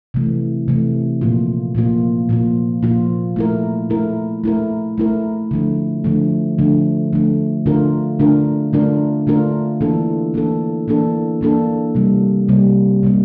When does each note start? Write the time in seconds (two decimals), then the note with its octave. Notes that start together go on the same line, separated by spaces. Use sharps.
0.14 C3 E3 A3
0.68 C3 E3 A3
1.21 A#2 F3 A#3 F4
1.75 A#2 F3 A#3 F4
2.29 A#2 F3 A#3 F4
2.83 A#2 F3 A#3 F4
3.36 A3 E4 A#4
3.90 A3 E4 A#4
4.44 A3 E4 A#4
4.98 A3 E4 A#4
5.51 D3 F3 A3
6.04 D3 F3 A3
6.58 D3 F3 A3
7.13 D3 F3 A3
7.66 D3 A3 D4 F4 A#4
8.19 D3 A3 D4 F4 A#4
8.73 D3 A3 D4 F4 A#4
9.27 D3 A3 D4 F4 A#4
9.81 E3 A#3 D4 A4
10.34 E3 A#3 D4 A4
10.88 E3 A#3 D4 A4
11.41 E3 A#3 D4 A4
11.95 C3 G3 A#3
12.49 C3 G3 A#3
13.03 C3 G3 A#3